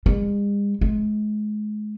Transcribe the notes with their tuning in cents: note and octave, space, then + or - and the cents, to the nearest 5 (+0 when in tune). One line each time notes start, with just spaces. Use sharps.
G#3 -45
G#3 +35